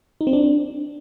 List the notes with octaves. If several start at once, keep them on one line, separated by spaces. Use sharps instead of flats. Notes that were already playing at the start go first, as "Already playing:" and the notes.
D#4
C4
D4